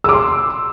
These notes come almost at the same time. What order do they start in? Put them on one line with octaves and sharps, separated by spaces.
E6 D6 C6